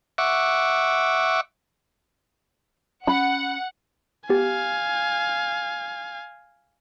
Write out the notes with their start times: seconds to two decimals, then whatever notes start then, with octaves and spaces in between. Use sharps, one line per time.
0.18 E5 F#5 C#6 D6
3.07 C#4 F#5 B5
4.29 B3 G4 F5 G#5